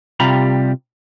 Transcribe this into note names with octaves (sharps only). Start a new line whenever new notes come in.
C3 G3 F4 G4 A#5 B5